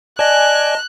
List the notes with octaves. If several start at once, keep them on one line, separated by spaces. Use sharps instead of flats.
D5 D#5 G#5 A5 F#6